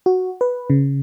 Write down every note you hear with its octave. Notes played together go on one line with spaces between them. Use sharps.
F#4
B4
C#3